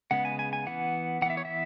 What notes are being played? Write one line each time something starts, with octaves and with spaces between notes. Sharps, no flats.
C#3 G#3 B3 F#5
G#5
G#5
G#5
E3 B3 F#5
E3 B3 E5 F#5
C#5
E5